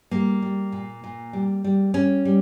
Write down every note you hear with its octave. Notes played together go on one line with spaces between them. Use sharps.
G3 A#3
G3
A#2
A#2
G3
G3
G3 C#4
G3